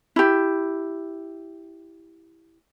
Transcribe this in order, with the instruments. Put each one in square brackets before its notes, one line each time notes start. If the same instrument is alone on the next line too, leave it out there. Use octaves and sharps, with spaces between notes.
[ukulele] E4 G4